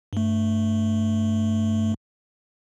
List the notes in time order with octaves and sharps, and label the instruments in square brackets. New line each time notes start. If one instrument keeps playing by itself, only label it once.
[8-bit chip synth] G2 A3